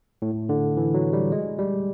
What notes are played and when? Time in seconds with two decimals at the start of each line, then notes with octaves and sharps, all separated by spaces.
0.22 A2
0.49 D3
0.77 E3
0.94 F#3
1.13 G3
1.32 G#3
1.59 G3